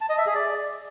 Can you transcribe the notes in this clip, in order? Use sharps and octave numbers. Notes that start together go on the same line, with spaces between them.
A5
D#5
E5
G#4
D5